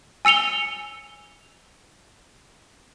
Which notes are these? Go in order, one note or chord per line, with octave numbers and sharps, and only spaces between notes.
G#5 E6 C#7 F7 G7